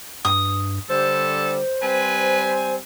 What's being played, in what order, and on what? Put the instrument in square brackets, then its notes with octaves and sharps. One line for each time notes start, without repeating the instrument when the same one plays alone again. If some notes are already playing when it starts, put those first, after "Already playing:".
[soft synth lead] G2 [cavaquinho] D#6
[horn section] D3 G3 [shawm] A4 [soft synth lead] C5
[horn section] G3 C4 G#5 [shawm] B4